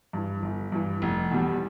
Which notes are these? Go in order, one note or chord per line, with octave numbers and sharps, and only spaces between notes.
G2 E3
G1
G2 E3
F1
E2 B2 G3